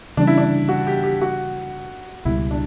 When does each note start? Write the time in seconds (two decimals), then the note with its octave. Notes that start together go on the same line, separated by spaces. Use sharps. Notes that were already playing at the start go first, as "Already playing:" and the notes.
0.17 C#3 E3 G3 C#4 D4
0.27 E4
0.38 D4
0.69 F#4
0.87 G4
1.03 G4
1.22 F#4
2.25 C#2 B2 G3 E4
2.51 D4